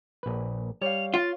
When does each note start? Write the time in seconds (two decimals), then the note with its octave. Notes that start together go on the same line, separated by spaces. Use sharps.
0.23 A#1 B4
0.82 G3 C#5 F5 F7
1.14 F4 A6